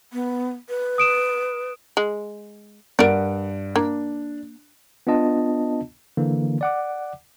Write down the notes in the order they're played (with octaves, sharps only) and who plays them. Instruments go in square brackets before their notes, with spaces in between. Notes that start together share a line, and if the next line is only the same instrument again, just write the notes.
[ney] B3
B4
[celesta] D#6 D7 E7
[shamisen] G#3
[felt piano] G2 F#5 D7 [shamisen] A#4 D5
[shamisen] A#3 [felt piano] D4
[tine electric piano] B3 D4 F4 D#5 A5
D3 E3 A#3
D5 F#5 D6